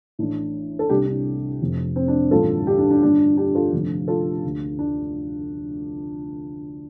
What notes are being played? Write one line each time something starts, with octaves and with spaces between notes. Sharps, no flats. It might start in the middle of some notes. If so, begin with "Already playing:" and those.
A1 A2 D4
A4
C2 C3 D4 G4
D4
F1 F2 C3
C4
D4
A1 G2 D3 F4 A4
D4 G4
D4
D4
G1 G2 D3 D4
D4 G4
F4 A4
F1 F2 D3
F4 A4
D2 D3
D4